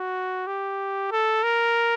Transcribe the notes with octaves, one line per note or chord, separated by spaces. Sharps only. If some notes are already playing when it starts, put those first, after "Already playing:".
Already playing: F#4
G4
A4
A#4